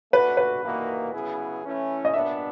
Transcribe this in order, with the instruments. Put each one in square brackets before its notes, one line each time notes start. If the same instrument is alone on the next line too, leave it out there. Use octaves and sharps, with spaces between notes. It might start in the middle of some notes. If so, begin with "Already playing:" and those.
[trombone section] A3 D4 F#4 [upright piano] B4
[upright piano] B4
[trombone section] E3 G3 A#3 D#4 F#4
C#3 F#3 B3 E4 G#4
E3 A3 C#4 E4
[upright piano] D#5
[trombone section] A#2 G3 B3 D4 [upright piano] E5